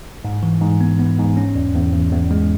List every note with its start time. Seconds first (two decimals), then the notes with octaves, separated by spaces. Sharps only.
0.25 G#2
0.43 E3
0.61 G#2
0.81 B3
0.99 B3
1.19 G#2
1.37 C#4
1.55 E2
1.75 E2
1.94 E2
2.13 E2
2.31 G#3